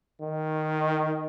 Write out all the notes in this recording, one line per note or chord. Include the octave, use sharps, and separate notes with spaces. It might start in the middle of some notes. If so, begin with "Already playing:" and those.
D#3